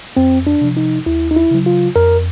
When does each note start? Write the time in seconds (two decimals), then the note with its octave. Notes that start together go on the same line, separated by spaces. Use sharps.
0.17 F2 C4
0.47 D4
0.62 C3 F3
0.77 D#4
1.06 D#2 E4
1.31 D#4
1.36 E4
1.51 C#3 F#3
1.66 F4
1.96 F2 A#4